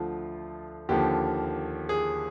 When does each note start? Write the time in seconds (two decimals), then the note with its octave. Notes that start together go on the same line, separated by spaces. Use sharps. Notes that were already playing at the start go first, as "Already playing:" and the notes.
Already playing: D2 D3 F3 F4
0.89 D#2 D3 F3 G4
1.89 G#4